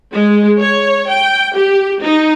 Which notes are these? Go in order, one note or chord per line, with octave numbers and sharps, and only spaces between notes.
G#3
C#5
G5
G4
D#4